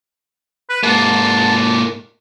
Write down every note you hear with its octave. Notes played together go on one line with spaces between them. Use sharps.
B4
G#2 A#3 A5